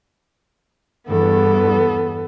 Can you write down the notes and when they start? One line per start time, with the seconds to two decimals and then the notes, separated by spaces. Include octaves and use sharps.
1.09 E2 G2 B3 A4